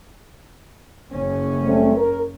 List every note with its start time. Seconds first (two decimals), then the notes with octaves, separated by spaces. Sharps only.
1.11 F#1 C#4
1.63 G3 A3 C4
1.97 A#4